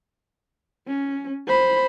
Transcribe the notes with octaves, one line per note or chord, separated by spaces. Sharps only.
C#4
C5 B5